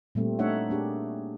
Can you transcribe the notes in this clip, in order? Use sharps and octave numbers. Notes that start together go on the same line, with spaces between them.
A#2 G3 A3 C4
A3 D4 D#4 C#5 E5 F#5
A#3 D4 G4 G#4